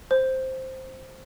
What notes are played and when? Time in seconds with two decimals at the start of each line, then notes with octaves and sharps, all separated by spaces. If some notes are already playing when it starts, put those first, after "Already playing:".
0.11 C5